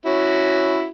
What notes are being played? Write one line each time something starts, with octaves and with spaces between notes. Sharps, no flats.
C#4 E4 F#4